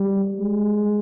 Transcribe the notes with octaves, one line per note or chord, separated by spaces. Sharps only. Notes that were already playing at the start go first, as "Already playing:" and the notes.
Already playing: G3
G#3